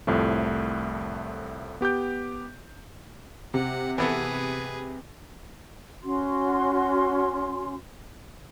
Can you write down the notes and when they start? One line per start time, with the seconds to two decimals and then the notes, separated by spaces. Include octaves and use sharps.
0.07 C2 F2 A2 F3 A3
1.81 B3 G4 D6 G6
3.54 C3 F#5
3.98 E3 B3 G#4 A4 B4
6.03 C#4 F#4 C6